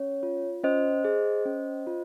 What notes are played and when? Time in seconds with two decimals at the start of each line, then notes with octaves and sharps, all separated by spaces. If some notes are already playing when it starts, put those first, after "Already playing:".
Already playing: C#4 C#5
0.23 F4
0.63 C#4 C5 D#5
1.04 G#4
1.46 C#4
1.87 F4